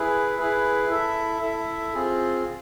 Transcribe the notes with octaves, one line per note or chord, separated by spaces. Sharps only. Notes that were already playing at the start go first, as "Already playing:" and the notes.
Already playing: E4 G#4 B4
E4 G#4 B4
E4 A4 E5
E4 A4 E5
C4 F4 G#4